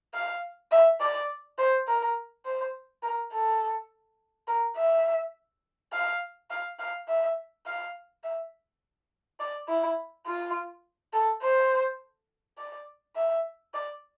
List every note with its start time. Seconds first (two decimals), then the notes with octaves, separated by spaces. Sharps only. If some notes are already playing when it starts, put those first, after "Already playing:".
0.14 F5
0.71 E5
1.01 D5
1.58 C5
1.87 A#4
2.45 C5
3.03 A#4
3.32 A4
4.47 A#4
4.76 E5
5.92 F5
6.50 F5
6.79 F5
7.08 E5
7.66 F5
8.23 E5
9.39 D5
9.68 E4
10.26 F4
11.13 A4
11.42 C5
12.58 D5
13.16 E5
13.74 D5